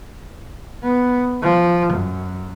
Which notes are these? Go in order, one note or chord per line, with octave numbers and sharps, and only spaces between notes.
B3
F3
F#2